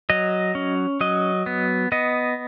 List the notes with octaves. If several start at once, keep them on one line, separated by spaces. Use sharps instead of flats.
F#3 D#5
C#4
F#3 D#5
B3
B3 D#5